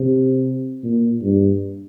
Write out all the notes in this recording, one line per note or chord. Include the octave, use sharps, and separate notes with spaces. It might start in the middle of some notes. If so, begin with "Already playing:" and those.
Already playing: C3
A#2
G2